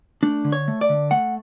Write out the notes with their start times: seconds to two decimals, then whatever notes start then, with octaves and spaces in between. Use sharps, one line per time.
0.23 A3 D4
0.44 D3
0.52 C#5
0.68 A3
0.81 D5
0.89 D3
1.11 A3 F#5